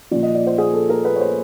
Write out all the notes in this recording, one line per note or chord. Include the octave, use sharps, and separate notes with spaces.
A#2 F3 D5
D#5
D5
C5
G#4
A4
A#4
B4
C#5
C5